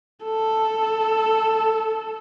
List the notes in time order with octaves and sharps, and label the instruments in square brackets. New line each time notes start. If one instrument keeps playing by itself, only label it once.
[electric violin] A4